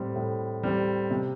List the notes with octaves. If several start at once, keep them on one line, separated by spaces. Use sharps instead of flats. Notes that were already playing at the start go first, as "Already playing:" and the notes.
Already playing: A2 G3 C4
A2
G3 C4
C3